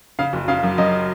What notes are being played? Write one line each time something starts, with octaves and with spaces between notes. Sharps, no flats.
C#3 F5
F#1
C#3 F5
F#2
F#2 D#5